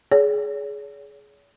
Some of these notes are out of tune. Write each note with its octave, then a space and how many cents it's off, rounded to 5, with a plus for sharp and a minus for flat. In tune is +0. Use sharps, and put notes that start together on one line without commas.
G#4 +15 C#5 +45